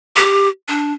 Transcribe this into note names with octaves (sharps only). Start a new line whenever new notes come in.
G4
D4